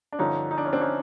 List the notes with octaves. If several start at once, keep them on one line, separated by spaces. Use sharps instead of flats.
D4
G2 D3 F3 C#4 D#4
D#4
D4
C#4
C4 D4
C#4 D#4